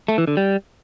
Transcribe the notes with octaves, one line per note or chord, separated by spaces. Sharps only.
A3
E3
D3
G3